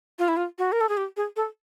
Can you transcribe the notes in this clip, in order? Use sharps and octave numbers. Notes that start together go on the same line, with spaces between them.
F4
E4
F4
F#4
A#4
A4
G#4
G4
G#4
A4